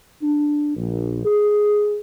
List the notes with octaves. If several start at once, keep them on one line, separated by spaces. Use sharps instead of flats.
D4
A#1
G#4